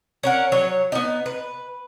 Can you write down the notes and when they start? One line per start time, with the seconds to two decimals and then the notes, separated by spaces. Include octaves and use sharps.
0.23 C#4 A#4 F#5
0.52 F#3 C#5
0.92 B3 D#4
1.26 B4